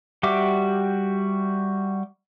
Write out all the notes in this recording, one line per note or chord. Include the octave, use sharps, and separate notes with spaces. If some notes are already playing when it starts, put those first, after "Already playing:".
G3 F#4 G4 E5 D6